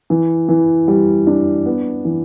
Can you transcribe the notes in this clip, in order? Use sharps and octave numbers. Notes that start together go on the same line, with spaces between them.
E3
E3
G3
D4
B3
E3